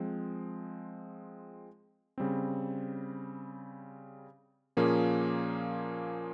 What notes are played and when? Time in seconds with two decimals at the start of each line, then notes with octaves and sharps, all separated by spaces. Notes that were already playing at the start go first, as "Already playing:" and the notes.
Already playing: F3 G#3 C4
2.18 C#3 G3 C4
4.77 A#2 F3 A#3 C#4 G#4